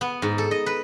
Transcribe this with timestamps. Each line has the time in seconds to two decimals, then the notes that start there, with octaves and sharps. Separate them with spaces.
0.01 B3
0.22 G#2
0.38 A4
0.51 D#5
0.66 B4